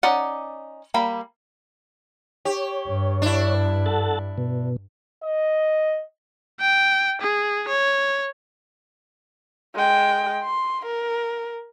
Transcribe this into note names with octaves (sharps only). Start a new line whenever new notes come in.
C#4 D#4 D5 F#5
G3 A#3 B5
G4 C#5
G2
D4 E4
A4 F#5 A5
B2
D#5
G5
G#4
C#5
G#3 G5
C6
A#4